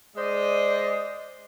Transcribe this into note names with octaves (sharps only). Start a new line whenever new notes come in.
G#3 C5 D5 D#5